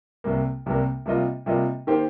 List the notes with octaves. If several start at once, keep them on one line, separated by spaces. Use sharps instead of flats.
C2 C3 G3 A#3
C2 C3 G3 A#3
C3 G3 A#3 F4 D#5
C3 G3 A#3 F4 D#5
D#3 A#3 G4 C5